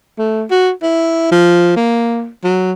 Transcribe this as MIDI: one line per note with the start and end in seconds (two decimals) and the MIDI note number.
0.18 0.44 57
0.51 0.71 66
0.83 1.31 64
1.32 1.75 53
1.76 2.29 58
2.44 2.72 54